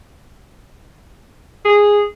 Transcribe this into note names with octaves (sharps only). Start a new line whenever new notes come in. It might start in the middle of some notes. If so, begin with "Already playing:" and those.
G#4